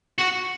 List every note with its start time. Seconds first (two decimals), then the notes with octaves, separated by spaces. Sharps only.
0.18 F#4